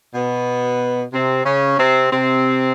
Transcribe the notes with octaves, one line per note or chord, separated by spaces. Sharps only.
B2 B3
C3 C4
C#3 C#4
C3 C4
C3 C4